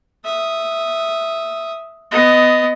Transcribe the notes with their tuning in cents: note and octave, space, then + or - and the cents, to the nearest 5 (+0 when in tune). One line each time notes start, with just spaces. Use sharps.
E5 +0 D#6 +0
B3 +25 D#5 +0